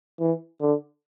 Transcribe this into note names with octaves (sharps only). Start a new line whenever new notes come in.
E3
D3